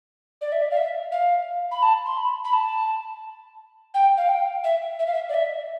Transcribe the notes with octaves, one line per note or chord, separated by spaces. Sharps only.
D5
E5
D5
F5
E5
F5
B5
A5
C6
B5
B5
A5
G5
F5
G5
E5
E5
F5
E5
D5
E5